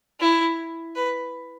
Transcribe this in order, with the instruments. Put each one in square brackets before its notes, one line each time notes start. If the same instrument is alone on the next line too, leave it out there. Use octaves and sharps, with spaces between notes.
[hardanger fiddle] E4
B4